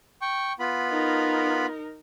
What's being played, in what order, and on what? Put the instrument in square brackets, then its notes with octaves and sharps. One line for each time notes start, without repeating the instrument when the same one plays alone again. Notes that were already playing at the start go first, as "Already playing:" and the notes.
[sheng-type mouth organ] G5 C#6
B3 F4 B5
[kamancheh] D#4 A#4